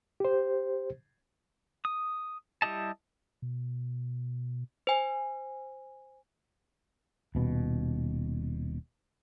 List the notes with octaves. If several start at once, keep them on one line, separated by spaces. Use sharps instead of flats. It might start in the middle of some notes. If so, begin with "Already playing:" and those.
G4 C5
D#6
G3 E4 G4 D#5 A5
B2
C5 G#5
D#1 B2